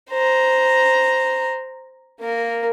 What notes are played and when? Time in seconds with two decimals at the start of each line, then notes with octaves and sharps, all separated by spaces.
0.11 C5 A#5
2.20 A#3 A#4